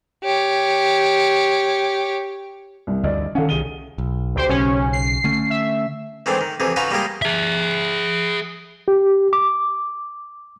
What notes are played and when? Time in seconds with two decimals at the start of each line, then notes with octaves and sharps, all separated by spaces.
0.24 G4 C#5
2.87 C2
3.03 D2 G2 D5 D#5
3.35 D#3 C#4 A4 F5 F#5
3.49 C2 D#3 G#4 D#7 G7
3.98 B1
4.35 D2 G4 C5
4.49 B1 C#3 C#4
4.93 C7
5.24 D3 A3 C#4
5.50 E5
6.26 D#3 E3 G#3 A3 C4 D4
6.41 D#3
6.60 F2 C3 E3 G#4
6.76 C#4 D#4 F4 F#4 B4
6.91 G3 G#3 A#3 G4 G#4 D#5
7.22 G#4 E5
8.88 G4
9.33 D6